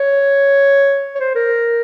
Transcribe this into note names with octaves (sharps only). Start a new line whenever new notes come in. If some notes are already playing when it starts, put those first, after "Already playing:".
Already playing: C#5
C#5
C5
A#4